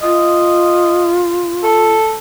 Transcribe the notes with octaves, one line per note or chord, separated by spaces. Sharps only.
F4 D#5
A4